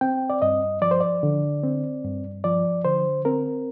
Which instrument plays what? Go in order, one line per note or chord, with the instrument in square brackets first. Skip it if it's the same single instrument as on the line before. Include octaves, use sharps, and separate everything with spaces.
[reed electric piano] C4 G5
D5
G2 D#5
F3 D5
C5
D5
D3
C4
G2
F3 D5
D3 C5
C4 A#4